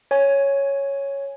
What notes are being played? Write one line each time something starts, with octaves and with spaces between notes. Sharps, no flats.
C#5 G#5